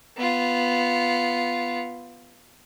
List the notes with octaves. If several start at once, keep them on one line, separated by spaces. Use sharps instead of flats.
B3 F4